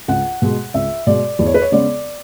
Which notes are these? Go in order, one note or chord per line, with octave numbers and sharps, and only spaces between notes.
C#2 F#5
B2 G#3
C#2 E5
B2 G#3 D5
E2 D5
C#5
B4
C#5
C#3 G#3 B3 D5